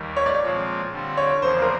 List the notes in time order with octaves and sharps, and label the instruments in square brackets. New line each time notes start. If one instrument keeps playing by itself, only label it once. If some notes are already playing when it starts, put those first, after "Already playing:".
Already playing: [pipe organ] D#2 D#3 G3
[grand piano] C#5
D5
C#5
[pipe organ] A#2 F3 G#3 C4 F4
D3 G3 C4 F4
[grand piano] C#5
[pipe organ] E2 C#3 F3 A#3 [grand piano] C5
[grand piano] A#4